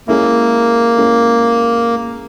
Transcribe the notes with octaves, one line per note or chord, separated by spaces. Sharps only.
G#3 A#3 C#4 E4
G#3 C#4 E4